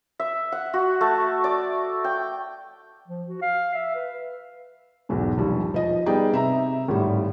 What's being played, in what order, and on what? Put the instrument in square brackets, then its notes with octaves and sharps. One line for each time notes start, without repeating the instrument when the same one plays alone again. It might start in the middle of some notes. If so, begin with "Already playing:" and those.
[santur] E5
F#5
F#4
A3
D5
G5
[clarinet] F3
F#4
F5
E5
B4
[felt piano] B1 E2 G#2 B2
A#1 D#2 G3
F3 D#5
G3 B3 D#4 G#4 D5 G5
C3 E5 A#5
G#1 A2 G3